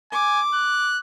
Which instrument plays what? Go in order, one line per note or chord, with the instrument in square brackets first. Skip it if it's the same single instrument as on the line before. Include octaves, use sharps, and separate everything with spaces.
[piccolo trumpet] G#5 [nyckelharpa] D6
[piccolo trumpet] F#6